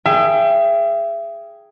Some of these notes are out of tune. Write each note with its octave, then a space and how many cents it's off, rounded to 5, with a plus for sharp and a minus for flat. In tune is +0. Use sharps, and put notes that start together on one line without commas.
G#4 +0 E5 +35 G5 +0